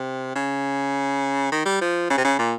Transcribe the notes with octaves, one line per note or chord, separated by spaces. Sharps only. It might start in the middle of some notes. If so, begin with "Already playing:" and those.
Already playing: C3
C#3
D#3
G3
F3
C#3
C3
C#3
A#2